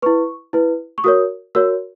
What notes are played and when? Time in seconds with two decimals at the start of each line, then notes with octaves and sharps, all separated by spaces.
0.02 E4 B4 C#6
0.53 E4 B4
0.98 C#6
1.04 F#4 A#4 C#5 D#6
1.55 F#4 A#4 C#5 E6